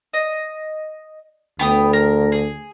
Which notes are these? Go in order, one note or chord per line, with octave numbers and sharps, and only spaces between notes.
D#5
D2 B3 G5 D#6
A#4
G#4